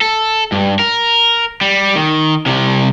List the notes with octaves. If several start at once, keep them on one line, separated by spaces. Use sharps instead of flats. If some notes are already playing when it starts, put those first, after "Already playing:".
A4
G2
A#4
G3
D#3
C2 C3